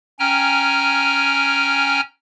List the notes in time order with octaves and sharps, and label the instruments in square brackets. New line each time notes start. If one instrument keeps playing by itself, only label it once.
[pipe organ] C#4 G5 G#5 A#5 F6